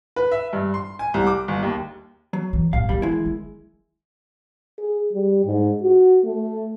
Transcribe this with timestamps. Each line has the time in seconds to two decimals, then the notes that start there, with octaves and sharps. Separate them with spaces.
0.16 B4
0.31 E5
0.53 G2
0.74 C6
0.99 G#5
1.14 C2
1.27 D6
1.48 G1
1.63 D#2
2.33 F#3
2.53 E3
2.73 G1 A2 F5
2.89 D#3 E3 G3
3.02 G#3 E4
3.25 D#3
4.78 G#4
5.13 G3
5.45 G#2
5.83 F#4
6.24 A3